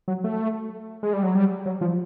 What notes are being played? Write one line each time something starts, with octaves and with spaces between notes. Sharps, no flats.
F#3
A3
G#3
G3
F#3
G3
F#3
F3